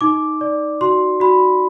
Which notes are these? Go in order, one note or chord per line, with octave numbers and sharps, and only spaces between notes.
D#4 D6
D5
F#4 C6
F#4 B5